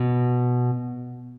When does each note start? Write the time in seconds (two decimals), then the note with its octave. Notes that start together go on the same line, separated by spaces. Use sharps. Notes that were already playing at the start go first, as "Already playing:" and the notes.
Already playing: B2